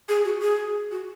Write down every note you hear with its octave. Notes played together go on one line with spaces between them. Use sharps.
G#4
F#4
G#4
F#4